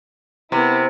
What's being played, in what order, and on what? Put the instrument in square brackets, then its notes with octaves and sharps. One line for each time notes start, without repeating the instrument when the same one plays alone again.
[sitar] C3 [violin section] B3 E4 A#4